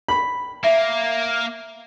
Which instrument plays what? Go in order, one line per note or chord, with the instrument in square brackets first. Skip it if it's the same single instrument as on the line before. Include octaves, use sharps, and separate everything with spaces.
[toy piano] D5 G5 C#6 [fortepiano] B5
[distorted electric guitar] A#3 [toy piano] E5 A#5